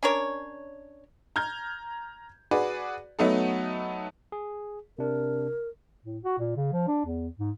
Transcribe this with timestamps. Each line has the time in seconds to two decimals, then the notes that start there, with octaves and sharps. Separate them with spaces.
0.03 C#4 D4 A#4 C#5
1.36 A#5 F6 G6 G#6
2.51 F#4 G#4 B4 D5
3.19 F#3 A3 B3 D#4 A4
4.32 G#4
4.99 C3 D4 A#4
6.05 A2
6.24 F#4
6.39 A#2
6.56 C#3
6.72 F3
6.87 D4
7.05 E2
7.38 G#2